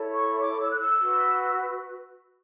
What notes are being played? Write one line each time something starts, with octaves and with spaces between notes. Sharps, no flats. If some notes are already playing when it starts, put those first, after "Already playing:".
Already playing: E4 A4 C#5
C#6
D6
E6
F#6
E6
F#4 B4